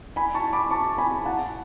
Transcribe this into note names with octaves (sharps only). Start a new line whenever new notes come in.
G#5 B5
A5 C#6
B5 D6
A5 C#6
G#5 B5
F#5 A5